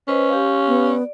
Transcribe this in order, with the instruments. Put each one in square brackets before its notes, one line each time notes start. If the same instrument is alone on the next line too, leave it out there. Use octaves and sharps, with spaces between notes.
[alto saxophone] C#4 [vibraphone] B4 C5 D#5
[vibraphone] G4 F5
[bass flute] B3
[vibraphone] D5